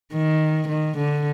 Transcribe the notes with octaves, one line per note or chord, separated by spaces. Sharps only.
D#3
D#3
D3